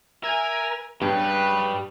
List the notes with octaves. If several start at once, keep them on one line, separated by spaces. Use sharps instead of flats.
A#4 E5 G#5
G2 C#3 G3 B4 G5